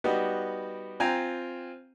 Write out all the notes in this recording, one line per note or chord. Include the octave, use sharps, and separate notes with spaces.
G3 B3 D#4 F#4 G4
C4 F4 G5 G#5 A#5